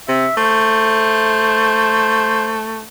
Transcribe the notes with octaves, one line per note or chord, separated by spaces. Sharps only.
C3 E5
A3 C5